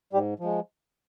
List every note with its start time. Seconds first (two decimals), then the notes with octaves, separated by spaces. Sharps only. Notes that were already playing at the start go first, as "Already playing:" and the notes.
0.13 G#2 G3 G4
0.40 F3 G#3